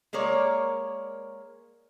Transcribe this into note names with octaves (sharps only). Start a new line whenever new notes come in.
G#3 A#3 A#4 C#5 D5